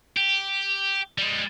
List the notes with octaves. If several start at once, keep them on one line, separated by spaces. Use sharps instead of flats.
G4
G3 G#3